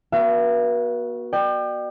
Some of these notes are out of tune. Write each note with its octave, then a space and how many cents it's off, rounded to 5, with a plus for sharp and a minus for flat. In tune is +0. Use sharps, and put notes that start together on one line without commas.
B3 -45 F#4 +0 E5 +45
D5 +40 G5 +0